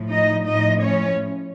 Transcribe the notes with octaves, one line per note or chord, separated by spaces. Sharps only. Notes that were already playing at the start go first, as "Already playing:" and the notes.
Already playing: A2 F3
D#4 D#5
A2 F3 D#4 D#5
C#4 C#5